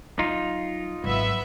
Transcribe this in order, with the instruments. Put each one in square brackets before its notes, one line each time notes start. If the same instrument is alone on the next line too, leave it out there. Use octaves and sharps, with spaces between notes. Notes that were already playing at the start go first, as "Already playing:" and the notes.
[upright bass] F#3 [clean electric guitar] D#4 F4
[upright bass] G#1 F#3 [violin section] B3 E5